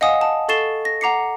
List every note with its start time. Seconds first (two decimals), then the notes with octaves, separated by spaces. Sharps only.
0.01 D#5 F5 F#5 G#5 D#6
0.21 A5 D#6
0.48 A4 C#6 A6 C7 E7 G7
0.85 A#6
1.01 F#5 A#5 D6 C7 C#7